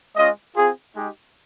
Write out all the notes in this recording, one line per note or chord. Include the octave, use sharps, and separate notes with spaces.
G#3 C#4 F4 D#5
C4 F4 G#4
G#3 D#4 G4